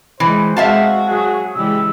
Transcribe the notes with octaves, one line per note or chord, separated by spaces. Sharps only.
E3 G3 G#3 C5
G#3 C4 F#4 E5 F5 A5
F#3 G#4
C#3 E3 G3 G#3 E6